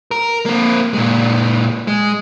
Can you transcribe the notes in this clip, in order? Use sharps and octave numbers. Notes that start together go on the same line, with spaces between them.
A#4
A#3 C4
A#2 G#3
G#3